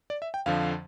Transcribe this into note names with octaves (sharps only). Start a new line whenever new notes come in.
D5
E5
G5
F2 D3 F3 F5